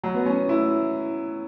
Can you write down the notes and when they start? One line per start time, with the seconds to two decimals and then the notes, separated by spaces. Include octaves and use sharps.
0.04 F#3
0.15 B3
0.26 C#4
0.49 E4